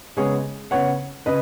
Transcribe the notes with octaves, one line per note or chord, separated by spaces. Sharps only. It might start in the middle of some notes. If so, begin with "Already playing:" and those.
C#3 G#3 B3 G#4 C#5
C#3 B3 C#5 F#5
C#3 B4 D#5